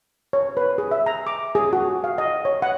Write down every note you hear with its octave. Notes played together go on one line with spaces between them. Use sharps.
C#5
B4
G#4
E5
A#5
D6
G#4
F#4
F5
D#5
C#5
F#5